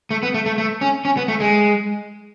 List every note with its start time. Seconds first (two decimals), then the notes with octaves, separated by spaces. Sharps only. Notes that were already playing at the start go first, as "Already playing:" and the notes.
0.11 A3
0.23 B3
0.34 A3
0.46 A3
0.58 A3
0.81 C#4
1.05 C#4
1.17 B3
1.28 A3
1.40 G#3